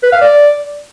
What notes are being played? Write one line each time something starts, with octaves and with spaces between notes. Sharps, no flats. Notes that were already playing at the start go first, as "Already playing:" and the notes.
B4
F5
D5